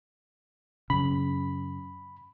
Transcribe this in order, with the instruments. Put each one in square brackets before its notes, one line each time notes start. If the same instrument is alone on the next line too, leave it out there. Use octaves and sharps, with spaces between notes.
[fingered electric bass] F#2 C#3 [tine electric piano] B5